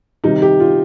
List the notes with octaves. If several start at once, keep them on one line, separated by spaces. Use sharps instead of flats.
C3 D#3 G3 D#4
G4
F4